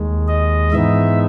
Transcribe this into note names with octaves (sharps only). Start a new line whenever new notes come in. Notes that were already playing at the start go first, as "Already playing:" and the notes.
Already playing: D#2 D#3 G#3
D#5
G#2 E3 G#3 B3 D#4 E5